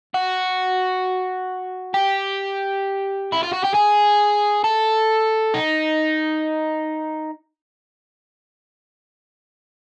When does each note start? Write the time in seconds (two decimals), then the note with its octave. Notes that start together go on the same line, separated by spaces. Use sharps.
0.14 F#4
1.94 G4
3.32 E4
3.43 F4
3.53 F#4
3.64 G4
3.74 G#4
4.64 A4
5.54 D#4